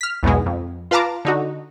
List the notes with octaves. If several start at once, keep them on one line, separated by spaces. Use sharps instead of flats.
F6 B6
B1 E2 G#2 B2 G#3
F2
F4 B4 F5 A5 A#5 D6
D3 D#4 F#4